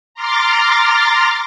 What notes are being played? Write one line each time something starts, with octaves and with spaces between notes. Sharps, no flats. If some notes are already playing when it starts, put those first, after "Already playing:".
A#5 C6 D6 F6 A6 A#6